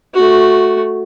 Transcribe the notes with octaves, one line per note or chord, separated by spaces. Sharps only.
A3 F#4